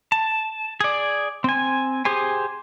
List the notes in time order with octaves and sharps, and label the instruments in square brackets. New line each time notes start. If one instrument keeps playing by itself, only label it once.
[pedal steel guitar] A5
G#4 D5
C4 G#5
G4 G#4 C5 G#5